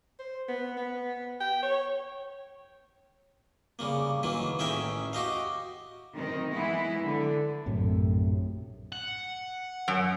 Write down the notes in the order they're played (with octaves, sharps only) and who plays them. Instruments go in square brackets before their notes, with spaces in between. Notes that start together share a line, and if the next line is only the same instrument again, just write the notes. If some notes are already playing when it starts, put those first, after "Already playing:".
[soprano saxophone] C5
B3
B3
G5
C#5
[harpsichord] C#3 G3 A#3
D#3 E3 F#3 A#3
A1 C#4 G#4 A#4 E5 G5
F#4 G4 D#5 F5
[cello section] D#3 C4 D#4
E3 G#3 B3 E4
D3
[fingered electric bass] A#1 F#2 A2 C3
[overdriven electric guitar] F#5
[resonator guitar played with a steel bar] F#2